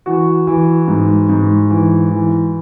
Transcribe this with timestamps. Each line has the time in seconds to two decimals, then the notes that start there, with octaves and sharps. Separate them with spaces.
0.06 E3 F#4
0.47 E3
0.88 G#2
1.29 G#2
1.70 E3
2.11 E3